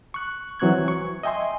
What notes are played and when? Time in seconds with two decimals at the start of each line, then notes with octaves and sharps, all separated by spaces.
0.14 C#6 F#6
0.60 E3 F#3 C4 C#6 F#6 G#6
0.88 C#6
1.23 D#5 E5 G5 G#5 C6